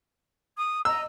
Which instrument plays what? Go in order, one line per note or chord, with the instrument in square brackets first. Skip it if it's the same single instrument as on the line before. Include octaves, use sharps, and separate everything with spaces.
[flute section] D#6
[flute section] D#5 A#5 [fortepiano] E6